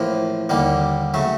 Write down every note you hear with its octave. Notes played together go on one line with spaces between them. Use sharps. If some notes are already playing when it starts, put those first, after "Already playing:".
Already playing: A1 A2 F3 A#3
D#2 D3 G3 A#3
C#3 F#3 A3